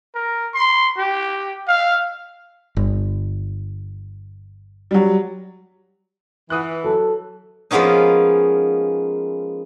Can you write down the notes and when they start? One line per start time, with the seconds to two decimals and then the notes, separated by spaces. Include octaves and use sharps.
0.15 A#4
0.54 C6
0.98 G4
1.67 F5
2.77 G1
4.91 F#3 G3
6.50 E3 F#5 D#6 F#6
6.84 F#3 A4
7.71 F3 G#3 A#3 B3 C#4 D#4